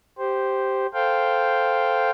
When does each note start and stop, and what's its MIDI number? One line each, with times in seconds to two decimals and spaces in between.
0.18 0.86 67
0.18 0.86 72
0.93 2.10 69
0.93 2.10 72
0.93 2.10 77
0.93 2.10 79